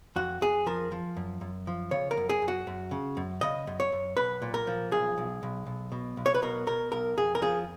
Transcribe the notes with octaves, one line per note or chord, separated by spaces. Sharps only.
F2 F#4
F2 G#4
F3 A#4
F3
F#2
F#2
F3
C#3 C#5
A#4
F#2
G#4
F#2
F#4
F#2
C#3
F#2
C#3 D#5
F#2
C#5
F#2
B1 B4
A#2
A#4
F3
B1 G#4
B1
B1
B1
B2
B1
C#5
B4
B2 A#4
B2 A#4
B1 A#4
F2 G#4
A#4
F3 G#4